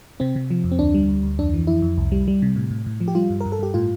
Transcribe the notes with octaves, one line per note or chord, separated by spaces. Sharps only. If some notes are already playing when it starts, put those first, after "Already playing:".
C3 C4
C3
F3
F2
C4
D2 D4
G3
D2
D2
F2 D4
E3
F2 E4
F2
C2
G3
G3
C3
A2
A2
A2
F3
G4
G3 F4
G2
A#4
G2
A4
G2 G4
A2 F4